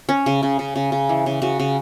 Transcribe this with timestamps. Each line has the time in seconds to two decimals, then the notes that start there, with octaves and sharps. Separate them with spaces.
0.09 C#4
0.26 C#3
0.43 C#3
0.59 C#3
0.76 C#3
0.92 C#3
1.09 E3
1.26 C#3
1.42 C#3 F#4
1.60 C#3